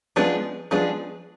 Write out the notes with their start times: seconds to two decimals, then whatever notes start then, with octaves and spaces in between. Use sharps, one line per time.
0.16 F3 G#3 B3 D4 G#4
0.71 F3 G#3 B3 D4 G#4